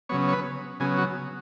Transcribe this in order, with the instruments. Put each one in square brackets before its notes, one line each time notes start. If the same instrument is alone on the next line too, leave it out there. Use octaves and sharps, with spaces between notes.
[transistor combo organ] C#3 F#3 B3 C#5
C#5
B4
C#3 F#3 B3 G#4
F#4